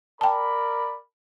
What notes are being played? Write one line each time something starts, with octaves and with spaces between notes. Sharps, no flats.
A#4 D5 G5 A5 B5